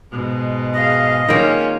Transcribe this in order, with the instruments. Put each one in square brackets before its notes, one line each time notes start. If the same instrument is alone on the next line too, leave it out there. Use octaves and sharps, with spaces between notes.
[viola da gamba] G#2 B2
[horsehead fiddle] G#4 F5 [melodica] D#5
[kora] D#3 A#3 [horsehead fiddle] G#3 [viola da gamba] C#4 F4